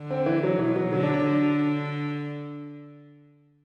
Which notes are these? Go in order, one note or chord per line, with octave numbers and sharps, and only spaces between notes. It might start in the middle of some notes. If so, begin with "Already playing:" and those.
Already playing: D3
C4
E3
F#3
B2 E3
F#3
D3 F#3
D4
D4
D3